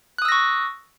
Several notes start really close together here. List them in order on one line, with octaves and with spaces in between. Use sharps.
F#6 D#6 E6 A#6 C#6